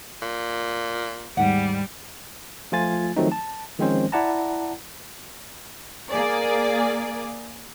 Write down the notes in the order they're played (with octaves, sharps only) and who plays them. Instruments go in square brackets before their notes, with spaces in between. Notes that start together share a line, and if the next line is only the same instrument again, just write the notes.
[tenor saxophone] A#2
[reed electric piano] D#2 G#2 [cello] G3 [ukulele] F#5
[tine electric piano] F3 A3 F4 G#5 A6
D#3 F3 F#3 A3 C4 D#4
A5
D#3 F3 G#3 C4 C#4 C5
E4 D5 F#5 A5 A#5
[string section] A#3 G#4 D5